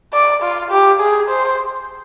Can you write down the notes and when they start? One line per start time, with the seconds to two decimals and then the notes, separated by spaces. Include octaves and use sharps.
0.14 D5
0.43 F4
0.71 G4
1.00 G#4
1.29 C5